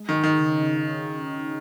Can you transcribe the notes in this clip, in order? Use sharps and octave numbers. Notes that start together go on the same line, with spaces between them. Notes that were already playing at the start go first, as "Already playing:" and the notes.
Already playing: G#3
D#3
D#4
D#3
C#3
C#3